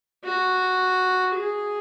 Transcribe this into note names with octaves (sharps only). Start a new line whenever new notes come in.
F#4
G#4